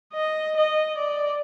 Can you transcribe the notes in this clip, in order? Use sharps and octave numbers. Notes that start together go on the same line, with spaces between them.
D#5
D#5
D5